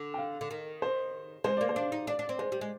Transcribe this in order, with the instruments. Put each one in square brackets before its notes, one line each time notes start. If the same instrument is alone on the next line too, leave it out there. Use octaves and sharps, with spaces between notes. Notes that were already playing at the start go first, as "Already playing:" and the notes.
Already playing: [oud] D3
[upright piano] G5
F5
[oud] D3
D#3
[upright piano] C5
[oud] G#3 [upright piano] C5
[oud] A#3 [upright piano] D5
[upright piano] C5
[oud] D4
D#4
[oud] D4 [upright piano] D5
[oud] D4
C4
[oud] G#3 [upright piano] C5
[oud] G3
G#3